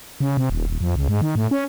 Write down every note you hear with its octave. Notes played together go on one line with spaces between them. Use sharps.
C#3
C3
D#1
D#1
F2
C#2
G#2
D#3
A2
C#4